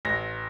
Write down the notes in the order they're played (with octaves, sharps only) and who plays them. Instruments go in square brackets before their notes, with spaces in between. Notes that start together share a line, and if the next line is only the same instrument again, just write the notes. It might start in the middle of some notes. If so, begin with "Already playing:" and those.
[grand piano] A1 A#6